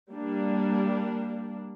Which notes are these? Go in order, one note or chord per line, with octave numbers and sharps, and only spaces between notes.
G3 A#3 D4